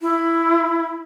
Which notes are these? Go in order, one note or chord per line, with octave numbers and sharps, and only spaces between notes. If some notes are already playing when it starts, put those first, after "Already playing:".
E4